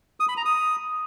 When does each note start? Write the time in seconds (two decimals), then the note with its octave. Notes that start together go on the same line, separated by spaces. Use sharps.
0.20 D#6
0.28 B5
0.37 A#5
0.45 D#6